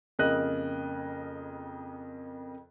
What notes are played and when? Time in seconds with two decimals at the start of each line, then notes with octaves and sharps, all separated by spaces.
0.19 F2 C#3 A#3 A#4 D#5 F#6